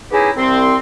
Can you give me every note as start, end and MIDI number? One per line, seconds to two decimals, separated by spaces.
0.11 0.30 59
0.11 0.30 61
0.11 0.30 63
0.11 0.30 64
0.11 0.30 67
0.11 0.30 68
0.36 0.76 36
0.36 0.76 60
0.36 0.76 84